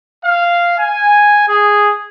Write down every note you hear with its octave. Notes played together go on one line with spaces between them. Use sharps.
F5
G#5
G#4